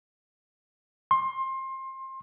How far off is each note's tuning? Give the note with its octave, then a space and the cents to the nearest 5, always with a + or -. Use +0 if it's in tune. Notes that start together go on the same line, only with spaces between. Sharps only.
C6 +25